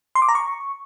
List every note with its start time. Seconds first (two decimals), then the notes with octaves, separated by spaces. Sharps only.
0.15 C6
0.22 D6
0.29 A#5
0.35 C#6